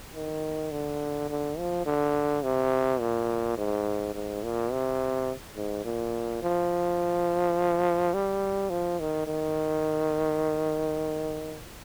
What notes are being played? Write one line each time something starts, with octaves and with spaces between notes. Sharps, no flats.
D#3
D3
D3
F3
D3
C3
A#2
G#2
G#2
A#2
C3
G#2
A#2
F3
G3
F3
D#3
D#3